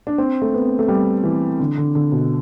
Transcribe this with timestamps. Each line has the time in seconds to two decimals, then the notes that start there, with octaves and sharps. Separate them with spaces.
0.07 D4
0.18 C4
0.42 A3
0.54 B3
0.79 A3
0.88 G3
1.24 E3
1.60 D3
1.77 D3
1.95 D3
2.12 B2